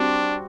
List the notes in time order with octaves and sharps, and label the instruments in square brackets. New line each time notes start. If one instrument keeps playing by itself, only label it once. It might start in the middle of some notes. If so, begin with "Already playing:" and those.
Already playing: [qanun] G3 C4 F#4 [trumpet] D4